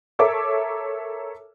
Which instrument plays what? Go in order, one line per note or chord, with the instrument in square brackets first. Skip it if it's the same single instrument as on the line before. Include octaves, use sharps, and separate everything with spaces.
[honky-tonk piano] A4 A#4 C#5 E5 D6